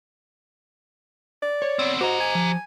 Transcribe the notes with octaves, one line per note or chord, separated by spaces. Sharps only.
D5
C#5
B3 C4
F#4 G4 C5 D#5 A#5
G#5
F3